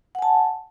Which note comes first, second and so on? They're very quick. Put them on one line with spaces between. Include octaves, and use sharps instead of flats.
F#5 G#5 A5